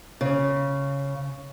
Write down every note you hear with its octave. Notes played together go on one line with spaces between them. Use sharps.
C#3